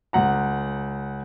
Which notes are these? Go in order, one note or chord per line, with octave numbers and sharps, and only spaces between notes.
C#2 F#5 A#5